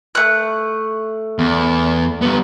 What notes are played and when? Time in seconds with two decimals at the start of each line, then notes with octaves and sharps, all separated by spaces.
0.15 A3 F#6
1.39 E2
2.22 G3 B3